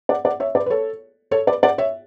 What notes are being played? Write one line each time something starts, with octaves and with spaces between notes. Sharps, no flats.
D5 F#5
D5 F#5
C#5 E5
B4 D5
B4
A4 C#5
A4 C#5
B4 D5
D5 F#5
C#5 E5